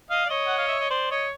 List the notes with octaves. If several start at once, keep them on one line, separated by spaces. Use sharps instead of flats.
D#5 F5
D5
C#5 D#5
F#5
F5
E5
D#5
C5 D5
C#5 D#5